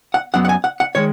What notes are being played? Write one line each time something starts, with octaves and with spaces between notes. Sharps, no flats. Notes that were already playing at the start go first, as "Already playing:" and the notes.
F#5
F#2 F#3 B3 F#5
F#5
G#5
F#5
F#5
D#3 G#3 C#5